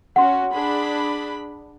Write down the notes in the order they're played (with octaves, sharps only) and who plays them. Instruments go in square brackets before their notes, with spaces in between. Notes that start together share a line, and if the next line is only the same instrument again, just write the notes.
[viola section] C#4 F#4 [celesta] F#5 C6
[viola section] D4 G#4 B5